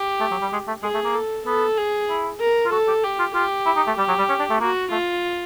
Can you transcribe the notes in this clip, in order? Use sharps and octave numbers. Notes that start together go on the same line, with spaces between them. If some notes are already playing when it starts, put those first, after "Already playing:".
Already playing: G4
A3
F#3
G3
G#3
A3
G#3 G#4
A3
A#3
A4
B3 A4
G#4
E4
A#4
F4
F#4 A4
G4
G4
F4
F4 G4
E4
D#4
A3
G3 G4
F#3
G3
C#4
D4
A3
A#3 F#4
A3 F4